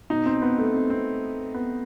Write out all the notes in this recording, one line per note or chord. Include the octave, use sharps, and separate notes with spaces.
B2 D#4
C4
B3
A3
C4
C4
B3